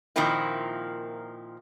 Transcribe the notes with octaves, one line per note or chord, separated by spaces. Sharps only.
A#2 D#3 F3 A#3 C4 E4